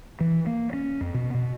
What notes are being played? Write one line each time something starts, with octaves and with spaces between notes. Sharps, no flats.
E3
A#3
C#4
F2
B2
B2